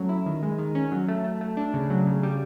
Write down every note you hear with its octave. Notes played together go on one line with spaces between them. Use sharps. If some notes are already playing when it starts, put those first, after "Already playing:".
Already playing: F#3 A3 C#4
E4
D#3
G#3
D#3
C#4
F#3
A3
A3
A3
D4
C#3
F#3
C#3
G3